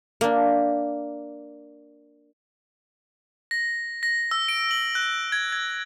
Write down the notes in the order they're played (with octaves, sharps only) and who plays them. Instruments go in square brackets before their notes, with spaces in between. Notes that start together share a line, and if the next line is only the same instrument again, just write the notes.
[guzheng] A#3 D4
[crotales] A#6
A#6
E6
D7
F#7
F#6
G#6
G#6